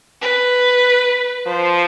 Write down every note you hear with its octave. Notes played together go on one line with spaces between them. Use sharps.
B4
F3 C5